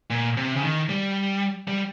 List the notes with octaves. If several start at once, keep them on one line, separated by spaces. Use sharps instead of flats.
A#2
C3
C#3
D#3
G3
G3